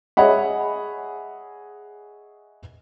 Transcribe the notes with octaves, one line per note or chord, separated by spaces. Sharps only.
G#4 C#5 D#5 E5 F#5 B5